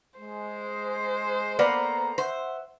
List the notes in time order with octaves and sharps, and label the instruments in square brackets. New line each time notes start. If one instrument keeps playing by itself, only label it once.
[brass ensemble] G#3 [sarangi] C5
[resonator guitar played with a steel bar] A#3 B3 [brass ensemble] A4 A#5 [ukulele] D5
[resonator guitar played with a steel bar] C5 [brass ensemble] E5 F#5